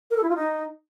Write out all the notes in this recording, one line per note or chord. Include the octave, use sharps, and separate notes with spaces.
A#4
A4
E4
F4
D#4